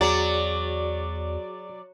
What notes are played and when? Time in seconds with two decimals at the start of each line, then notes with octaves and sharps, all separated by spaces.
0.01 E2 F#3 F#4 G#4 D5